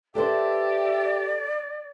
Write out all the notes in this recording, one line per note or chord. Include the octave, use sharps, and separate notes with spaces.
G4 A4 B4 C5 D5 E5